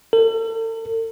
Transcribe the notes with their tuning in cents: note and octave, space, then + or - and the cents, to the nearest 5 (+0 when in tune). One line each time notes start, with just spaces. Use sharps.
A4 +45